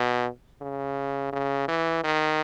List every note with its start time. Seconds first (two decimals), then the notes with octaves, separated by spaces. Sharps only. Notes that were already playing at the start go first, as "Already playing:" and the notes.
Already playing: B2
0.61 C#3
1.32 C#3
1.68 E3
2.04 D#3